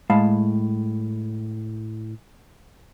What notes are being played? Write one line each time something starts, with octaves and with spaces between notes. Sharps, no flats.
A2 G#3 F5 A5 B5